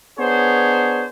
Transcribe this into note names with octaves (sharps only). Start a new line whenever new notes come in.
B3 D4 G#4 C5 C#5